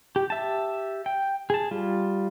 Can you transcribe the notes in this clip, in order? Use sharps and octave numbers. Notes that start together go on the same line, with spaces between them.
G4
G4 E5 A5
G5
G#4 A5
G3 F4